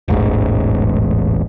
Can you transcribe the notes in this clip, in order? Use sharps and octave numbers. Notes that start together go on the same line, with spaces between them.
E1 A1 G#2